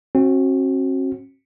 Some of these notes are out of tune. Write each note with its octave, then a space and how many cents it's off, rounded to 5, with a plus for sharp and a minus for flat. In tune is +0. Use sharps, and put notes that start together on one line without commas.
C4 +45 F#4 +0